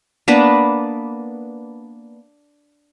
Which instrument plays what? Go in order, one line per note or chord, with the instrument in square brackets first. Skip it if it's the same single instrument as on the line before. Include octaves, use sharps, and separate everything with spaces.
[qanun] A#3 B3 D4 B4